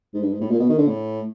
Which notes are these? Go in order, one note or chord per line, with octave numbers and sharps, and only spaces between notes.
G#2
G2
G#2
A2
A#2
B2
D#3
D3
A2